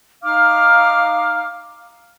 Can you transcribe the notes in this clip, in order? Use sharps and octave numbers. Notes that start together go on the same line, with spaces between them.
D#4 F5 D6 F6